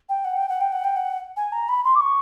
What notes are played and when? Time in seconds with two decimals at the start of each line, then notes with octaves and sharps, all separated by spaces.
0.09 G5
0.25 F#5
0.37 G5
0.49 F#5
0.61 G5
0.72 F#5
0.84 G5
0.96 F#5
1.37 G#5
1.52 A#5
1.69 B5
1.84 C6
1.95 D6
2.00 C#6